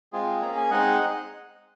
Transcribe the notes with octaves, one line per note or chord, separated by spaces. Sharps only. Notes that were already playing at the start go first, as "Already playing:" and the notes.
G#3 C4 F4 G#4
A#3 C#4 G#4 A#5
G#5
G#3 C4 D#4 G#4 D#5 F#5